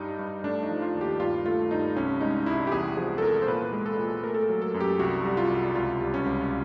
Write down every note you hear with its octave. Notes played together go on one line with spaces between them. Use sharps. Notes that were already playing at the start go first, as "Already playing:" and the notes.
Already playing: G2 G3 D#4
G2
A3 D4
D#4
F3
F4
D#2
G4
G2 F4
A3 F4
G2 D#4
C2 C#4
G#3 D#4
C2 E4
G4
E2 G#4
F3 G#4
A4
E2 A#4
C5
A#2 B4
G#3
A4
A#2
A3 A#4
A4
A#4
F#3
A4
F#2
G4
C2 F#4
G3
F4
C2
C#2 F4
G3
C#4
C#2